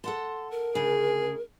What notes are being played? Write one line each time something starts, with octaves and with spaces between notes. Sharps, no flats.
A4 F#5 A5 C6
A#4
D2 C#3 G#4